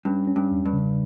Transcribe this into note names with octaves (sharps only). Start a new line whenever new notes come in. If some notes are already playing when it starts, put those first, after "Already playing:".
G2 C#4
C#4
G2
E2
G2
C#3